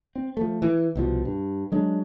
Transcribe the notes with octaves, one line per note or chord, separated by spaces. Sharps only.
C4
F3 A3
E3
C2 B2 F3
G2
F#3 G#3 D4